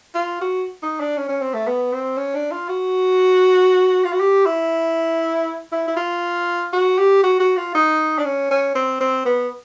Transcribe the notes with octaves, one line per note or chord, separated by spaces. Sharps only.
F4
F#4
D#4
D4
C#4
C#4
C4
A3
B3
C4
C#4
D4
F4
F#4
F4
F#4
G4
E4
E4
E4
F4
F#4
G4
F#4
F#4
F4
D#4
D4
C#4
C#4
C4
C4
B3